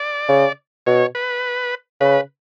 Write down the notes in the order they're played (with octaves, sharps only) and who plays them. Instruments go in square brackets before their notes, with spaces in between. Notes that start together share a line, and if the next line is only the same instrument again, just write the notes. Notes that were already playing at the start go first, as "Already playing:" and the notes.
Already playing: [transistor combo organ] D5
[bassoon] C#3
[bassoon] B2 [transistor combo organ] C#5
[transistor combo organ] B4
[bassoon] C#3 [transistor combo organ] B4